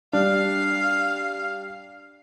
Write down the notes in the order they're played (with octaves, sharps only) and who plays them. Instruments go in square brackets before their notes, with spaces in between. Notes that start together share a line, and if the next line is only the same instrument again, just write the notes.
[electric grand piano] G3 D4 [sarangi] F5